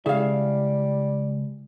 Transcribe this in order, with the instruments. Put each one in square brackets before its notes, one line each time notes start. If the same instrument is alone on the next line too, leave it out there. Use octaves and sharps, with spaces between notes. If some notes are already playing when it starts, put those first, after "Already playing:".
[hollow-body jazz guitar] C#3 E4 E5 [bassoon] G3 [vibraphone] G#3 [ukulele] G#4 F5